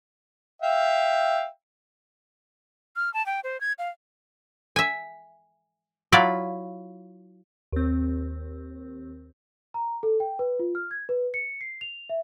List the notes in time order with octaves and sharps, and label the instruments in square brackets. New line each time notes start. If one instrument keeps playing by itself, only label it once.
[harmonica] E5 F5 G5
[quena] F6
A5
G5
C5
G#6
F5
[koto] E5 G#5
F#3 E4 F4 D5 F5
[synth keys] D#2 C4
[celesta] A#5
A4
G5
B4
F4
F6
G#6
B4
C#7
C7
F7
E5